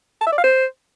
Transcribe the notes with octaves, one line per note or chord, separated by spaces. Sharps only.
A5
E5
D5
F5
C5